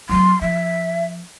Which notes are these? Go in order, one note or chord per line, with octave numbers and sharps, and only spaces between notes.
F#3 B3 C6
F3 E5